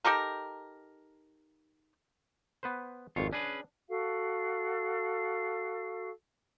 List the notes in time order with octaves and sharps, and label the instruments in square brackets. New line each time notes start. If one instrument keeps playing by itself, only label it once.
[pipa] D#4 G4 A4 A#4
[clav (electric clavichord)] B3 B4 C5
[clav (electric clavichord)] G#1 F2 [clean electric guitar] F4 C#5
[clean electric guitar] C#4 G#4 B4 [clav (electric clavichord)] D4
[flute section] F#4 A4 F5